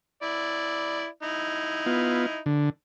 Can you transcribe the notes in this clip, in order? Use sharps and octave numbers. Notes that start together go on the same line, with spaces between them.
E4 D5
D#4 E4
B3 F4
D3